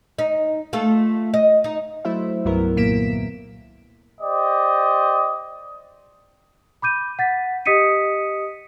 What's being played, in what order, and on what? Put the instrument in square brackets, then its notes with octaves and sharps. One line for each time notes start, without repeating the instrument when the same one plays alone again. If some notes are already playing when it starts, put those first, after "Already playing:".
[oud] D#4
A3 F4 A4
D#5
D#4
[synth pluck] F#3 A3 E4 C5 E5
C2 G2 F#3 B3 E4 A#4
D#2 A#2 A#3 B6 D7 E7
[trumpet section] G4 C5 D5 D#5
[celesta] B5 D6 G6 D#7
F#5 A6 B6
G4 D#5 D#6 B6 C#7 D#7